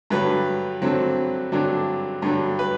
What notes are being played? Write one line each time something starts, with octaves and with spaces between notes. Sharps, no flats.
G2 D3 F#3 B4
G2 D3 F#3 C4
G2 D3 F#3 D4
G2 D3 F#3
B4